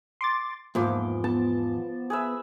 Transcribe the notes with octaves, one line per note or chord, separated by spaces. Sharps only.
C6 D6 A6
E2 G#2 F3 A#3 C6 D6
B3 A5
G#4 B4 E5